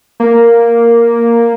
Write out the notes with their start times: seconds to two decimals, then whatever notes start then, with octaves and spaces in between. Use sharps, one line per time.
0.20 A#3